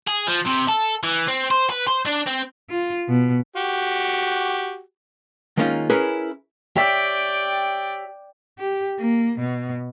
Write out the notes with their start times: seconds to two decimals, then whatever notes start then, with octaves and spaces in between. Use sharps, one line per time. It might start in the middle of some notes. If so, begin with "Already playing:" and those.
0.07 G#4
0.27 F3
0.46 C3
0.68 A4
1.04 E3
1.28 C4
1.51 C5
1.70 B4
1.88 C5
2.06 D4
2.27 C4
2.70 F4
3.09 B2
3.56 F#4 G4
5.57 D#3 G#3 A#3 C#4 D#4 F4
5.90 C#4 E4 G#4 A#4 B4 C#5
6.77 G4 C#5 D5 E5 G5
8.59 G4
8.99 A#3
9.39 B2